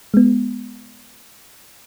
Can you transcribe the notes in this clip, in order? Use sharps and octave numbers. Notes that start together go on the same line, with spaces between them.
G#3 B3